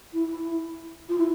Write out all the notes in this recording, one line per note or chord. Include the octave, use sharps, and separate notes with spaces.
E4
F4
E4